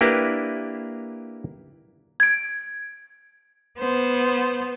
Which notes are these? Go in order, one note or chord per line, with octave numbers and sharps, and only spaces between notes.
A#3 D4 E4 G4 A#4 B4
G#6 D7
B3 C5